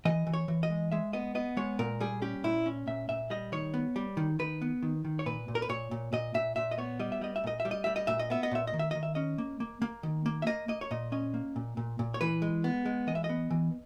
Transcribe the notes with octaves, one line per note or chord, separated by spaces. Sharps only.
E3 D#5
E3
C#5
E3
D#5
G#3
G#3 E5
B3 D#5
B3 D#5
G#3 C#5
A#2 A#4
G3 G#4
C#4 G4
A#2 E4
C#4
A#2 E5
A#2 E5
G3 D#5
D#3 C#5
B3
G3
D#3
D#3 B4
B3
D#3
D#3
C#5
A#2 B4
A#2
A#4
B4
A#2 C#5
A#2
A#2 D#5
A#2 E5
A#2 E5
D#5
B3 C#5
G3 D#5
E5
G3 D#5
E5
A#2 D#5
E5
G3
D#5
G3 E5
D#5
A#2 E5
D#5
B3 E5
D#5
A#2 E5
D#5
D#3
E5
D#3 D#5
E5
C#4 D#5
A#3
A#3
A#3
D#3
A#3
E5
A#3 D#5
A#3 D#5
C#5
A#2 D#5
C#4 D#5
A#3
A#2
A#2
A#2
C#5
E3 B4
G#3
B3
G#3
E3 D#5
E5
D#5
B3
E3